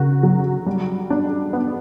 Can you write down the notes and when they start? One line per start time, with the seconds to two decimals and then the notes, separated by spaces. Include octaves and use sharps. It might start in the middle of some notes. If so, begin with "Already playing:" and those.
Already playing: C#3 F#4 A#4
0.23 F#3
0.66 G3
1.10 D4
1.53 B3